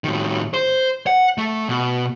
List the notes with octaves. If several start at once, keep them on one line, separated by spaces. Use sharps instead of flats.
A2 D#3
C5
F#5
A3
B2